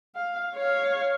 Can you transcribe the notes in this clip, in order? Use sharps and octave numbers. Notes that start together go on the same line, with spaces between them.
F5
C#5 F5